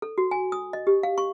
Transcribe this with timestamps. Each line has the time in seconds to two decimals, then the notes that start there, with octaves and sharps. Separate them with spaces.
0.02 A4
0.18 F#4
0.31 G#5
0.52 D#6
0.73 D#5
0.87 G4
1.03 F5
1.18 C#6